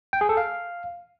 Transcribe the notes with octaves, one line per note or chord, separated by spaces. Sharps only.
G5
G#4
A4
F5